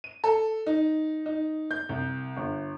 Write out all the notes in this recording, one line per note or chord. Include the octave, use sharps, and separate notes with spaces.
D#7
A4
D#4
D#4
G6
C2
G1